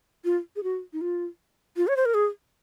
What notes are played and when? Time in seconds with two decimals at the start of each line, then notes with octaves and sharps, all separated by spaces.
0.24 F4
0.56 G#4
0.63 F#4
0.93 D#4
1.01 F4
1.77 F4
1.88 C#5
1.97 C5
2.05 A#4
2.14 G#4